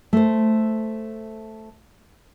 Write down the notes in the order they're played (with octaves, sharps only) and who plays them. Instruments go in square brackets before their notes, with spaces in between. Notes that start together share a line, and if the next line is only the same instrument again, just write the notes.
[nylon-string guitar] A3 C5